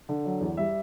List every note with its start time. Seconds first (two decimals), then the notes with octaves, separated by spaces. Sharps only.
0.09 D3
0.25 F#3
0.41 E2
0.57 G3 E5